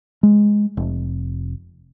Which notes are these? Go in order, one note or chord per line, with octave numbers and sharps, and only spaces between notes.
G#3
F1